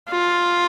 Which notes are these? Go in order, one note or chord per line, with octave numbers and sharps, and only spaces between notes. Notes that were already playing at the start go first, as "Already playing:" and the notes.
F4